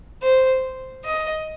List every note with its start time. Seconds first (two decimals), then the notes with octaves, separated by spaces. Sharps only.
0.23 C5
1.05 D#5